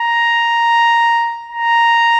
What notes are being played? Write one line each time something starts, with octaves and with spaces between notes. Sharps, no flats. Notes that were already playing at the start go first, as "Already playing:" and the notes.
Already playing: A#5
A#5